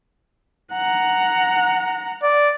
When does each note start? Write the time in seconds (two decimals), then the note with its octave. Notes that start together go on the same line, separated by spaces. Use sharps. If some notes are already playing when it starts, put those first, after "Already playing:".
0.72 F#5 A#5
2.23 D5